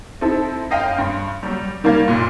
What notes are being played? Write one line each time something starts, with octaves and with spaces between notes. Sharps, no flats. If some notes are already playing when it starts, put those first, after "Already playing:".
C4 D#4 E4 A4
F#2 D#5 F5 G5
G2 C6
F#3 G3
D#3 G3 A#3 F5 G#6
F#1 A#2 C6